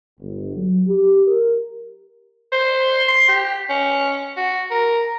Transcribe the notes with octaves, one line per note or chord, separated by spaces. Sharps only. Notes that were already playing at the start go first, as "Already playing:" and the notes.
G1
F#3
G4
A#4
C5
C6
G4
C#4
F#4
A#4